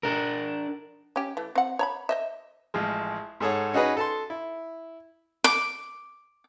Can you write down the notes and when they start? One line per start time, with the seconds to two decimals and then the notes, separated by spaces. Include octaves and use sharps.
0.03 D4 A#4
1.16 C#4 G4
1.37 E3 A3
1.55 C4 F#5
1.79 C#5 A#5 B5
2.09 C5 D#5 E5
2.74 A1 F3 G#3
3.40 G#2 G#4 A4 C#5 F#5
3.73 C#4 D#4 F#4 G#4 B4 D#5
3.97 A4 A5 C6
4.30 E4
5.44 D6